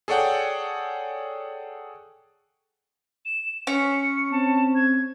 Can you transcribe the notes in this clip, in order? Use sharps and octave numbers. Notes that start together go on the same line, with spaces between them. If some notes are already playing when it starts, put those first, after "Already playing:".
G#4 A4 C#5 D5 F#5 G5
E7
C#4 C#7
C4 A5
G#6